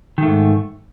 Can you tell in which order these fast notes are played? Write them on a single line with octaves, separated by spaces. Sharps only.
D#3 A3 G#2